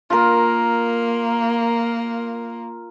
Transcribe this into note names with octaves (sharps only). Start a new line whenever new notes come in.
A#3 F4 A#4